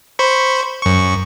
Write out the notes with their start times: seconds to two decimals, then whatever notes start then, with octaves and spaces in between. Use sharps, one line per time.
0.19 C5 B5 C#6
0.82 F#2 C#6